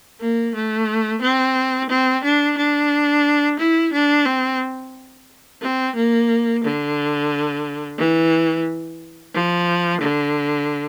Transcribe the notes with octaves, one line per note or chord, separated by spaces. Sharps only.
A#3
A3
C4
C4
D4
D4
E4
D4
C4
C4
A#3
D3
E3
F3
D3